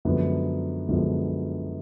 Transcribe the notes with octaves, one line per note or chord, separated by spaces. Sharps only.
F#2 D3 F3 G#3 B3
F#2 D3 F3 G#3 B3